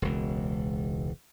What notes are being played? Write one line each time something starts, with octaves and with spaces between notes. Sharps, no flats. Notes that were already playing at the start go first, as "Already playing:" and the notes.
E1 C#2